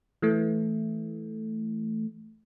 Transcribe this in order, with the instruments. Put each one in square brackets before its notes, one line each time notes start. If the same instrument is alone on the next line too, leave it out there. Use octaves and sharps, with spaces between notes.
[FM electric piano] E3 A3